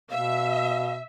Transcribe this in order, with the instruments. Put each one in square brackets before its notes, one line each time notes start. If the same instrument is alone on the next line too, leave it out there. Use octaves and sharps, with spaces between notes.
[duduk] B2 [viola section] E5 [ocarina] F5